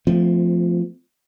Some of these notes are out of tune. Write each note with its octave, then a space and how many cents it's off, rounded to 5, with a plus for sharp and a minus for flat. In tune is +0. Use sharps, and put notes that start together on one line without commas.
F3 +0 A3 +0 C4 -30